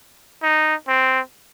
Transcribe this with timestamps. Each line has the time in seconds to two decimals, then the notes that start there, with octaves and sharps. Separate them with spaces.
0.43 D#4
0.88 C4